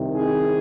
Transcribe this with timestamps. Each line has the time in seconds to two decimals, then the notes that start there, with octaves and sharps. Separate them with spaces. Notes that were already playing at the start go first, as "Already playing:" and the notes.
Already playing: C2 C3 D#3
0.15 G#4